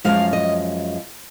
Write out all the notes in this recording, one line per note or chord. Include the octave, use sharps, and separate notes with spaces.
F#2 F3 G#3 F5
D#5